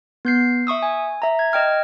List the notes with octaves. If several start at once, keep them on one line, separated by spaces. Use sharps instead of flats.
B3 G6 C7
E5 C#6 D#6 E6
G#5
E5 A#5
G#6
D#5 G5 F6 G#6